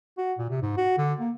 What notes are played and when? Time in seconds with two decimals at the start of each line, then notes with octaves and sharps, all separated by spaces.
0.18 F#4
0.38 A#2
0.50 C3
0.62 G#2
0.77 F#4
0.98 D3
1.20 A#3